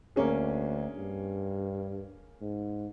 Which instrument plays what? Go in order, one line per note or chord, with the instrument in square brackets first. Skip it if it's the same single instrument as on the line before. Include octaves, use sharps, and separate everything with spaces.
[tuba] D2 [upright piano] A#3 C#4 G#4
[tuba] G2
G#2